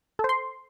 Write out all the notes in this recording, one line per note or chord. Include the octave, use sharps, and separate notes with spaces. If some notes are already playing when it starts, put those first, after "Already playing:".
A4
C5
C6